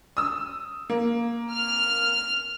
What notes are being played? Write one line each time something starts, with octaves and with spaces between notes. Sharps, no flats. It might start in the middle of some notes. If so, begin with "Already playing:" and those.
D#6 E6
A#3
F6